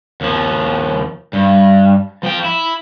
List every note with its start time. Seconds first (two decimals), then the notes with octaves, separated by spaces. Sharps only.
0.21 D#2 F3
1.33 G2
2.23 F3 G5
2.44 E4